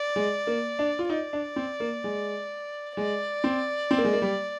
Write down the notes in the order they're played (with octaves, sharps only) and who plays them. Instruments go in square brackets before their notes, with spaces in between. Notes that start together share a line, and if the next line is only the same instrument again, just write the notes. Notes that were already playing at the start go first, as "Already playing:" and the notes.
Already playing: [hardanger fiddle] D5
[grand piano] G#3
A#3
D4
F4
[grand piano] D#4 [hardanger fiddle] D5
[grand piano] D4
C4
A#3
G#3
[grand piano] G#3 [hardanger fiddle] D5
[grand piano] C4
C4
A#3
G#3
A#3
G3